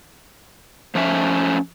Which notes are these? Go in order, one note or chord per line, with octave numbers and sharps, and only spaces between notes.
F3 A3 C#4 E5